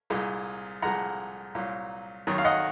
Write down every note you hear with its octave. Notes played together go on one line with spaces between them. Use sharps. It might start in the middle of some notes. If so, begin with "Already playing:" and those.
C2 A#2 G#3
C2 A#2 F3 G#3 F#5 A#5
C2 A#2 F#3
G#1 F#2 D#3 F#3
F5
D#5 F#5